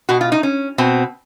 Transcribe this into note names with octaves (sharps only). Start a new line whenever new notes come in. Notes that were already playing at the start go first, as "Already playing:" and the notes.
B2 F#4
F4
D#4
C#4
B2 C4